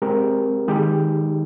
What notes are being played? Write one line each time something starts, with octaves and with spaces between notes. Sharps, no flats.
G#3 C4 G4 A#4
D#3 G#3 D#4 G4